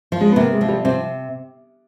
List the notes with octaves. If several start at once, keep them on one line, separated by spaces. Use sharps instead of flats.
F3
G#3
B3
C3 A#3
G#3
F3
G3
C3 C4